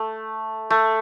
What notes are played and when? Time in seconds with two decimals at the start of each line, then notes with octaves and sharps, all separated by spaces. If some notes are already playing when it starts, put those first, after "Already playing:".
Already playing: A3
0.70 A3